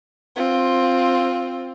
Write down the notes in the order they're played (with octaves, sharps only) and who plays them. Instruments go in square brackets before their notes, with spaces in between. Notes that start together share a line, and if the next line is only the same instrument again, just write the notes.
[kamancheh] C4 F4